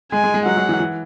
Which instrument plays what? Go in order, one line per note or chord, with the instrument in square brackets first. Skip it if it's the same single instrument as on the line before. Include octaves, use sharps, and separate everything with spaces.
[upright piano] G#3 [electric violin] G#5
[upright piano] G#3
G#3
[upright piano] F#3 [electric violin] F#5
[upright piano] F#3
E3
E3